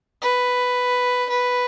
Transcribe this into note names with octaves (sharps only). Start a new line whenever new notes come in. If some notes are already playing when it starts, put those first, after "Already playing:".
B4
B4